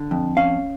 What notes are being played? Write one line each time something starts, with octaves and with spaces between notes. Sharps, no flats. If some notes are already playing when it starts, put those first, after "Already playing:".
Already playing: D3
F2
C#4 F5